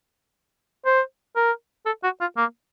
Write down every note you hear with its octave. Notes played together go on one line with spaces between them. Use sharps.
C5
A#4
A4
F#4
F4
A#3